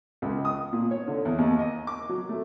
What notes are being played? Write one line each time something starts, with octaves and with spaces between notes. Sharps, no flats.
C#2
D#6
A#2
C#5
D3
E2
D#2
D#5
D6
F#3
A3